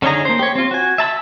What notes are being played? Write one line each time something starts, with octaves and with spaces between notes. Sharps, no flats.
D3 C#4 D#4 G#4 A#5
A#3 C5
G4 C#5
C4 F4
F#4 G#5
E5 A5 B5 E6